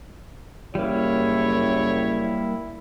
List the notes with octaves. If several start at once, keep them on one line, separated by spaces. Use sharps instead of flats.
F#1 G3 A#3 E4 C#5